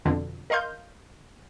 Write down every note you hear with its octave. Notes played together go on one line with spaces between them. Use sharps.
F2 B2 D3
A#4 D#5 F5 C6 G6